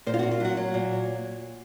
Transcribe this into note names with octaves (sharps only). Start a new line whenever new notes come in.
A#2 C5
F4
A#3 F#4
F4
F#3 F#4
F#3
A#2